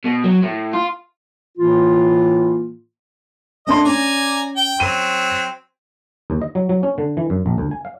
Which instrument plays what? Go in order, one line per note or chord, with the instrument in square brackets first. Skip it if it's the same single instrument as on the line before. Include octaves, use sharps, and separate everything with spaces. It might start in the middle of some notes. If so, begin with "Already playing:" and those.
[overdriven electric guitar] B2
F#3
A2
F4
[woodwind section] A2 E3 A#3 F4
[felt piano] A3 D4 C6 [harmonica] D#5
[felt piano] C#4 [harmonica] D5 G#5 A#5
[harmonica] G5
[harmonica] F#3 C4 [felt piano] D#7
[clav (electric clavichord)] D#2
D#5
F#3
F#3
C#4
D3
E3
F#2
A#1
D2
G#5
F5